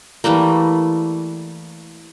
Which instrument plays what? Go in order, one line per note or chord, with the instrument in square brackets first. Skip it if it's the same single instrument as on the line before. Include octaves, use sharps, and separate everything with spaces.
[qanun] E3 G3 A3 A#3